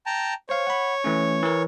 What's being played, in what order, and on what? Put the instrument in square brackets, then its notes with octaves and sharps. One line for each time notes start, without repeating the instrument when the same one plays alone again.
[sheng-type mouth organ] G5 A5 A#5
[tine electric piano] C5 F5 [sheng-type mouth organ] C#5
[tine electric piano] F#5 B5
E3 A3 C#4
E3 A#4